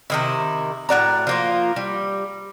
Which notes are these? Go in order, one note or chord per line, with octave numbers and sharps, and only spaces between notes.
C3 D#3 E4
A2 F#4 D5 A#5
F3 A#3 F4
G3